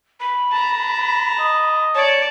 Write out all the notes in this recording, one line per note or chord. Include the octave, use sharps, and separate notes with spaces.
B5
A5 A#5
D#5
C#5 D5 A5